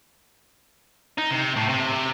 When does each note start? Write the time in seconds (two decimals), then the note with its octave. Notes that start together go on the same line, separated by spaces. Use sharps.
1.18 D#4
1.31 C3
1.56 A2
1.69 C3
1.93 C3